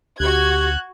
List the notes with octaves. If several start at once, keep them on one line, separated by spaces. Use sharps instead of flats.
D2 F#4 G4 F#6 G#6